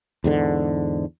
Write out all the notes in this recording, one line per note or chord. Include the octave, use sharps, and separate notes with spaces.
E2 G#2 D3